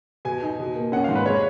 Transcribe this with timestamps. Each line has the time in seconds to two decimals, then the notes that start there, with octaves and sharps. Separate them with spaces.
0.25 B2 G#5
0.43 D#4
0.60 B2
0.75 A#3
0.92 C#4 F#5
1.04 F5
1.09 G#2
1.16 B4
1.26 G#3 C#5